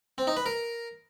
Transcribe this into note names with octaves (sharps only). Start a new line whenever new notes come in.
C4
D#4
B4
A#4